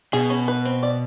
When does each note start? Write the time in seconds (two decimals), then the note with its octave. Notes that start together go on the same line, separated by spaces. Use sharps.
0.13 B2 G#4
0.30 C#4
0.48 B4
0.65 C4
0.83 D5